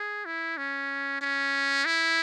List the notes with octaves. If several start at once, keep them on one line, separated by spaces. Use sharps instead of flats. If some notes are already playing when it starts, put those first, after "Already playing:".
Already playing: G#4
E4
C#4
C#4
E4